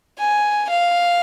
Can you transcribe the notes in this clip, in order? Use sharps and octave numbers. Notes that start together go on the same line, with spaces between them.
G#5
F5